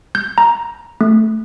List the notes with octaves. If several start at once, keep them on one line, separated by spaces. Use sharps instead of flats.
G6
A#5
A3